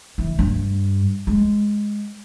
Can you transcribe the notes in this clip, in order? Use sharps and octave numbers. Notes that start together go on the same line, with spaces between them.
E3
G2
G#3